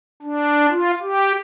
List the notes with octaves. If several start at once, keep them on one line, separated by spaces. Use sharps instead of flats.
D4
F4
G4